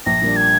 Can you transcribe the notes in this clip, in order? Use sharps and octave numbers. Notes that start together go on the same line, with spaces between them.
A#1 A#6
A#2 G3 A#3 D4
G#6